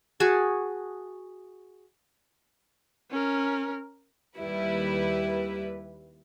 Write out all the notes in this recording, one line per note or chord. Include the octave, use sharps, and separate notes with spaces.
F#4 G#4 A5 C#6
C#4 A#4
D#2 G3 E4 B4